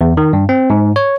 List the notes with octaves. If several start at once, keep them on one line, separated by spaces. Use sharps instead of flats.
E2
D#3
G2
C4
G#2
C#5